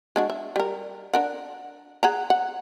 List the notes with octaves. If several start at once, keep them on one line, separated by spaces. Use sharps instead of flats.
G#3 D4 F#4
E5
G3 A#4
D4 A#4 F#5
G#4 F#5 A#5
F#5